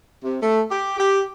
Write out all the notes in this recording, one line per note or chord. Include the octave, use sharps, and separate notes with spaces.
C3
A3
G4
G4